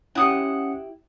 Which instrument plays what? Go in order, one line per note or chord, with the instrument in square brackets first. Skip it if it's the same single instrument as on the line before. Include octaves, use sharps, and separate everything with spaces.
[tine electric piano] C#4 C#7 [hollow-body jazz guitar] E4 G4 [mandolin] F#5 D#6